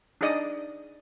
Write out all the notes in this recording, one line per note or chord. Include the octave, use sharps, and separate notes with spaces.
D4 D#4 G#4 D5 D#5 D#6